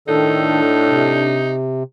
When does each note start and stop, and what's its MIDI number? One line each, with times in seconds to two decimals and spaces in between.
0.08 1.40 45
0.08 0.61 51
0.08 1.41 62
0.08 1.54 63
0.08 0.61 69
0.88 1.83 48